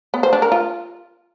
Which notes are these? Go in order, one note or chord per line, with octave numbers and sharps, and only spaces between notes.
B3
C5
D4
A#4
F4